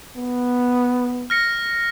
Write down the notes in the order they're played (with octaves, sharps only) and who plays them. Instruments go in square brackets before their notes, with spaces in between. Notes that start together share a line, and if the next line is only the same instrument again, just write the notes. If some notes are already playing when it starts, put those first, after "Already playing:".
[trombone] B3
[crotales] F6 A#6 C#7